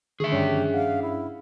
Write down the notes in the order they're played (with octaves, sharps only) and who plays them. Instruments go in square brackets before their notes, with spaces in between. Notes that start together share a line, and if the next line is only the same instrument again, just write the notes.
[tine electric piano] D3 D#3 A3 [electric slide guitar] G#4 E5 [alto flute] C#6
[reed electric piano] G2 C#4 D4 [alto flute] G4
[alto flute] F5 [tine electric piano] F#5
[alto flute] E4